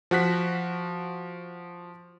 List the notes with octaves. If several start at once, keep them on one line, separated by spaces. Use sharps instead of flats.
F3 F#4 F#6 B6